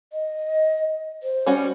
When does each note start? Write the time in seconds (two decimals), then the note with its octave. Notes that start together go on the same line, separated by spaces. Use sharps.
0.13 D#5
1.23 C5
1.46 G3 C#4 F#4